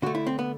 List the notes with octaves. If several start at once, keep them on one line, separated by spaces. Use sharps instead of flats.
D3 A3 F#4
E4
C4
B3